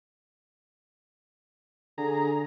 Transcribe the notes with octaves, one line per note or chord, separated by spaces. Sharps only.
D3 G#4 A#5